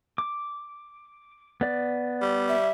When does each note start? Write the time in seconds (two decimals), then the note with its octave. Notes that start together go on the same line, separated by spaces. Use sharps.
0.18 D6
1.61 B3 D5
2.22 G3
2.48 E5